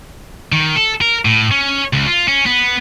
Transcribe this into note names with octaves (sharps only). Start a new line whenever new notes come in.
D#3
A4
A#4
A2
C#4
C#2
F4
C#4
B3